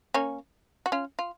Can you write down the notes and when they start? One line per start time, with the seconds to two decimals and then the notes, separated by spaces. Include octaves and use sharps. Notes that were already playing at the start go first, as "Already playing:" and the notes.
0.14 A#3 C#4
0.86 F#4
0.92 C#4 F4
1.19 F4